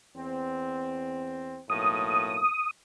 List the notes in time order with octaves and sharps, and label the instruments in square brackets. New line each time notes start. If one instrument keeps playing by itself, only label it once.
[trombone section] E2 C4
[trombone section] B1 A2 A#3 [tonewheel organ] D#6